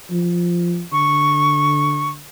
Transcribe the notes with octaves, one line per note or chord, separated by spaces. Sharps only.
F3
D3 C#6